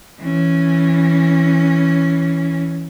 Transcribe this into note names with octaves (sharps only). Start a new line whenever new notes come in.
E3 C#4